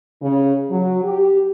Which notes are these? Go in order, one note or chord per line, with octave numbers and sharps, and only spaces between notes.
C#3
F#3
G4